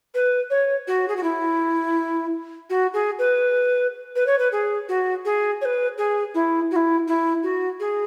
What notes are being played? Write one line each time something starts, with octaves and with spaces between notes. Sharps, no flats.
B4
C#5
F#4
G#4
F#4
E4
F#4
G#4
B4
B4
C#5
B4
G#4
F#4
G#4
C#5
B4
G#4
E4
F#4
E4
E4
F#4
G#4